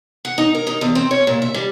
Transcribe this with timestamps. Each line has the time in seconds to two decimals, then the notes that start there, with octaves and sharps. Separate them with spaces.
0.25 F#5
0.38 D#4
0.55 A#4
0.67 D#4
0.81 E2
0.95 C4
1.11 C#5
1.27 A#2
1.42 E5
1.54 G3